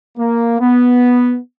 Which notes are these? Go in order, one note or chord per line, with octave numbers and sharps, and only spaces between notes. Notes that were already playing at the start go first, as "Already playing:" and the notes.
A#3
B3